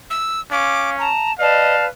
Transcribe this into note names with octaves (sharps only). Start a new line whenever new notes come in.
E6
C#4 F5 D6
A5 A#5
B4 D5 D#5 F5 A5